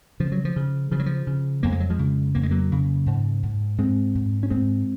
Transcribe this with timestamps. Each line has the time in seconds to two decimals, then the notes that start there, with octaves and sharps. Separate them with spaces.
0.20 C#3 F3
0.32 F#3
0.45 F3
0.56 C#3
0.92 C#3 F3
0.99 F#3
1.06 F3
1.27 C#3
1.63 F2 A#3
1.72 G#3
1.80 F#3
1.90 F3 G#3
1.99 C#3
2.35 F2 A#3
2.43 G#3
2.51 F#3 A#3
2.72 C#3
3.06 G#2
3.43 G#2
3.78 G#2 G#3 C4
4.15 G#2
4.43 C#4
4.50 G#2 G#3 C4